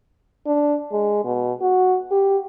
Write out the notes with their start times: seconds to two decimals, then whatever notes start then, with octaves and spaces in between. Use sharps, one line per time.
0.46 D4
0.92 G#3
1.24 B2
1.61 F#4
2.11 G4